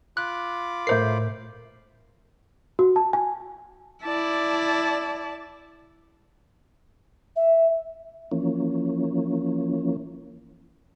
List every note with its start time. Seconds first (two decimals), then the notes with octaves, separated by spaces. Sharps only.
0.17 F4 B5 D6 F#6
0.87 A2 A3 A#4 C5 G6 C7
2.79 F#4
2.96 A5
3.13 G#5
4.04 E4 D5 A5
7.36 E5
8.32 E3 F3 A#3 C#4